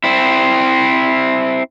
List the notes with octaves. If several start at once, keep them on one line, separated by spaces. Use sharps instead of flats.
C4 E4